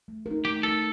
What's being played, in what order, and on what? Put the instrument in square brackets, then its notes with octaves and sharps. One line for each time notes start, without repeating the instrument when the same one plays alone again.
[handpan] A3
A#4
D#4
[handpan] A3 [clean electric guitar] G4
[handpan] D#4 A#4 [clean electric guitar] A4